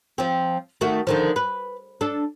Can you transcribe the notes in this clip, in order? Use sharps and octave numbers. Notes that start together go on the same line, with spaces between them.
F3 C4
D#3 A3 F#4
D3 D#3 F3
B4
D4 A4